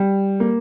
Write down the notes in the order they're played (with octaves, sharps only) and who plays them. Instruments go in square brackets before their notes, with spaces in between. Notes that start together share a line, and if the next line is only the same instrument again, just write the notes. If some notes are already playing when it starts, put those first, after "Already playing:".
Already playing: [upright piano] G3
A#3